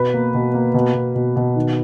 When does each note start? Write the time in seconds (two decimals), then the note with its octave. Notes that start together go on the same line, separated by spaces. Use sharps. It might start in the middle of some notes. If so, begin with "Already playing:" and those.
Already playing: B2 B4
0.14 A#3
0.34 B2
0.54 A#3
0.74 B2
0.94 B2
1.15 B2
1.36 B2
1.56 D#3